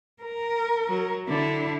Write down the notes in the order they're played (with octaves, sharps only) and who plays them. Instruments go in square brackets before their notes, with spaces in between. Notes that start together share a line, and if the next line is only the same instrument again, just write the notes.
[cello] A#4
[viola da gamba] F#3
[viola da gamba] D3 [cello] D4 E4